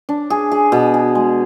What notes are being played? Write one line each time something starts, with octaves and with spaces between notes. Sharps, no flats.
D4
G#4
G#4
B2
G#4
G#3